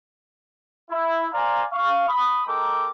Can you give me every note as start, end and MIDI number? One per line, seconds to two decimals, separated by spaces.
0.90 1.28 64
1.33 1.64 72
1.33 1.64 74
1.33 1.64 77
1.33 1.64 80
1.33 1.64 82
1.72 2.08 77
1.72 2.08 85
2.09 2.42 83
2.09 2.42 87
2.47 2.89 56
2.47 2.89 63
2.47 2.89 69
2.47 2.89 70
2.47 2.89 79
2.47 2.89 86